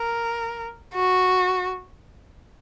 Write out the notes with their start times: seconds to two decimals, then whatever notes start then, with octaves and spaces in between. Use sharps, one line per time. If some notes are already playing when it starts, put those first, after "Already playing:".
Already playing: A#4
0.94 F#4